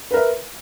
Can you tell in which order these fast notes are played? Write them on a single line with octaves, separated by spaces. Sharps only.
B4 A#4 E5